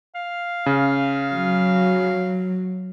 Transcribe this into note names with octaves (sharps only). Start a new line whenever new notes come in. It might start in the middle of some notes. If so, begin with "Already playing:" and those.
F5
C#3
F#3